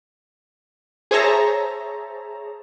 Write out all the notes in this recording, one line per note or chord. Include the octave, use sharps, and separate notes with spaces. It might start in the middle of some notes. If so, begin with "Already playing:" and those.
G#4 C5 C#5 E5 A5 A#5